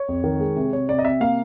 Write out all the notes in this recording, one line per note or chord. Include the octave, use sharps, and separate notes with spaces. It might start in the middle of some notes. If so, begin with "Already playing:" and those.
Already playing: C#5
F2
D#3
G#3
C3
C3 C#5
C3 D5
D#5
C3 E5
A#3 F5